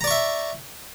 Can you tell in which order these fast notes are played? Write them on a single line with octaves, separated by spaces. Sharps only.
A#5 D5 C#6 E5